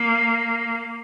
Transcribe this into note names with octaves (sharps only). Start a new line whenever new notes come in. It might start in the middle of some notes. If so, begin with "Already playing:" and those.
Already playing: A#3